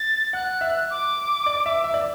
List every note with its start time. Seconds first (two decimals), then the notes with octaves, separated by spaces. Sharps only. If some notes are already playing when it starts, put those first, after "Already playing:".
Already playing: A6
0.33 F#5 F#6
0.61 E5
0.90 D6
1.46 D5
1.66 E5
1.84 E5
1.94 D5